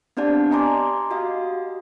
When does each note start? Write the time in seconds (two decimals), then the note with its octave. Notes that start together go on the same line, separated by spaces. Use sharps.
0.17 B3 C4 D4 G4 D5 A5
0.51 D#5 G#5 A#5 C6 D6
1.10 F#4 G4 D#5 F5